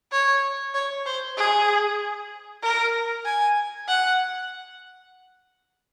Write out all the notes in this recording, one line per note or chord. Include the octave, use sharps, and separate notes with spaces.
C#5
C#5
C5
G#4
A#4
G#5
F#5